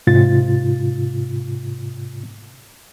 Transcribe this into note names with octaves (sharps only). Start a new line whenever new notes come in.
G#2 C3 F4 A6